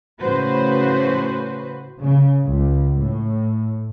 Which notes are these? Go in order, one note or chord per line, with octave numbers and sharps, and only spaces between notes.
A2 C#3 F#4 B4 C5
C#3
C#2
A2